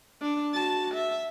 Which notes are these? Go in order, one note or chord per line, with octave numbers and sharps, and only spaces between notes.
D4
F#4 A5
E5